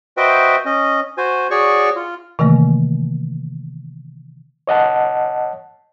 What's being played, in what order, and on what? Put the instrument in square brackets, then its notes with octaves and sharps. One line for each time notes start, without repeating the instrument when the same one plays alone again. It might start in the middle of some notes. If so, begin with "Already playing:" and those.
[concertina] F#4 B4 C5 D#5 E5 G5
C#4 D#5
F#4 C5 G#5
F#4 G#4 C#5 D5 C#6
F4
[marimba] C3 D#3 E3 A3 A#3
[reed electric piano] C#5 D#5 F#5 A5